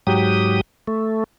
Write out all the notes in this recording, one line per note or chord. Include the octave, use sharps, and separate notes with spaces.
G#2 F#3 G4 D#6
A3